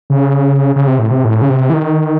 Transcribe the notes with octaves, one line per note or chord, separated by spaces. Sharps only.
C#3
C#3
C3
A2
C3
A2
C#3
C3
E3
D#3